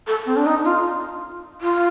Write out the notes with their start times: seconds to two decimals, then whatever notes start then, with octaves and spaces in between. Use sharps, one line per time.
0.07 A4
0.26 C4
0.36 D4
0.46 D#4
0.65 F4
1.61 F4